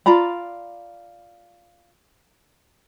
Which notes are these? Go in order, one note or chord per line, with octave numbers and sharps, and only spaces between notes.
F4 D5 A#5 B5